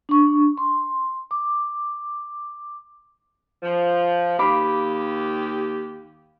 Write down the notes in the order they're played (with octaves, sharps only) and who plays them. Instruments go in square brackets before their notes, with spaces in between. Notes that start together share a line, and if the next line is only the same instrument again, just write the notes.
[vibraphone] D4 C#6
C6
D6
[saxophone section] F3
[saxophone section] D#2 G4 [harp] F5 B5 D6